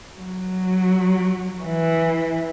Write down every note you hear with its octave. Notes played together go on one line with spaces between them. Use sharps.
F#3
E3